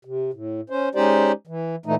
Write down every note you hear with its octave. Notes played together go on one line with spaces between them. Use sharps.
C3
A2
C#4 C5
G#3 C#4 D#4 G4 C5 D5
E3
A#2 E3 A3 D#4